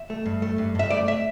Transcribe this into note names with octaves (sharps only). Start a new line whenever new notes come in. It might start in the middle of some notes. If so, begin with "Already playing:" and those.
Already playing: E5
A3
G2
A3
G2
G2 E5
A3 D5
E5